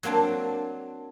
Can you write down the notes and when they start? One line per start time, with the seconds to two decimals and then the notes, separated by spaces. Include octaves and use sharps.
0.03 F#3 A#3 C4 D4 A5